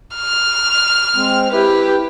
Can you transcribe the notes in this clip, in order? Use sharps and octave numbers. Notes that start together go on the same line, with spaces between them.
F6
G#3 C4
E4 G4 B4